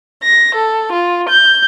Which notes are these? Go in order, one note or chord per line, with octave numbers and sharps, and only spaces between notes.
A#6
A4
F4
G6